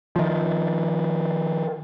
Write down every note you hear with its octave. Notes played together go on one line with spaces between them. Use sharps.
D#3 F3